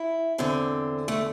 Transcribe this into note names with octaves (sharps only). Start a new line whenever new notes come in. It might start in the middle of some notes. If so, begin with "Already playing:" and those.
Already playing: E4
E2 D3 C4
A3